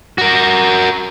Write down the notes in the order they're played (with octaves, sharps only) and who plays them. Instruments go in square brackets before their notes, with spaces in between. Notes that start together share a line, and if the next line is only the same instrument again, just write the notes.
[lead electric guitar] F#4 A#4